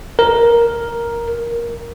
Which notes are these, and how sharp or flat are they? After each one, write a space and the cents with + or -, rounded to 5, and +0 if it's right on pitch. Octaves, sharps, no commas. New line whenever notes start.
A#4 +5